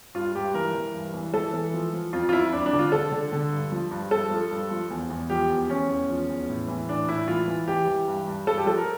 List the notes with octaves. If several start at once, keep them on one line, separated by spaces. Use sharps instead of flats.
G2 F4
G2 G4
E3 A#4
E3
G2
E3
E3 A4
E3
F3
F3
F2 F4
F4
F2 E4
F2 D4
D4
D3
F4
D3 A4
D3
D3
G2
F3
G2
G2 A4
F3
G2
F3
E2
E2
F3 G4
E2
E2 C#4
E2
F3
E2
A2
E3
A2 D4
A2 E4
E3 F4
E3
E3 G4
E3
G2
G2
G2 A4
G4
F3 A4
A#4